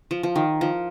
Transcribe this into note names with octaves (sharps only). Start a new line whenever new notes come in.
F3
F3
D#3
F3